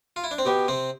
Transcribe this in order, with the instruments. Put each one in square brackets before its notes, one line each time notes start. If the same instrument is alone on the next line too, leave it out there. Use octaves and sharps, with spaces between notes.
[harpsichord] F4
E4
D4
C4
[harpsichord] B2 B3 [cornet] G4
[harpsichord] C3 C4